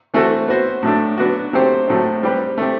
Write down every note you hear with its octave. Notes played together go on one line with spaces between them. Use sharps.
E3 A3 C4 F#4 A4
B3 F#4 C5
A2 F#3 A3 D4
F#3 B3 D4 F#4
F#3 A3 C4 G4 C5
A2 F#3 A3 C4
G3 C4 G4 B4
A3 C4 G4